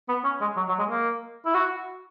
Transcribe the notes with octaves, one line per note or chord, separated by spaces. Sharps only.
B3
C#4
G#3
F#3
F#3
G#3
A#3
E4
F#4